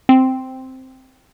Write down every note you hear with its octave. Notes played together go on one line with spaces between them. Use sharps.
C4